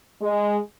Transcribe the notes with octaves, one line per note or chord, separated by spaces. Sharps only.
G#3